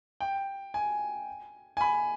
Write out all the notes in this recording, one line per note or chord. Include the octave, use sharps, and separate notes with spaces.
G5
G#5
G#5
B5